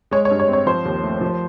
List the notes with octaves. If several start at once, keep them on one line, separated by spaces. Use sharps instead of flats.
G#3 C#5
C#5
G2
C#5
C4
C#5
F3 C5
D#2
A3
F3